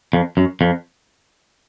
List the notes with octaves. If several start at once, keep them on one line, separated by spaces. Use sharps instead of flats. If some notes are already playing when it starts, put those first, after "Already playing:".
F2
F#2
F2